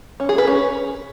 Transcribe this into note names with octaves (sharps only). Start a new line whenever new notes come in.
C#4
G#4
B4
C#4